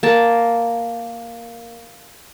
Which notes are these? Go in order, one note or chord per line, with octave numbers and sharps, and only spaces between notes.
A#3 A5